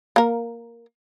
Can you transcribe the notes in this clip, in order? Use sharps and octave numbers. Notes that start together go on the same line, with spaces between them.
A#3 A#4